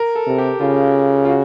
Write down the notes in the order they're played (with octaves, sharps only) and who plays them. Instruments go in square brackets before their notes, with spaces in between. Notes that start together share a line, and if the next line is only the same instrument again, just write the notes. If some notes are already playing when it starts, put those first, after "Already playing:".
Already playing: [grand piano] A#4
A4
[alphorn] C3
[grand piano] G4
[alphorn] C#3 [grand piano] F4
[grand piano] F4
F#4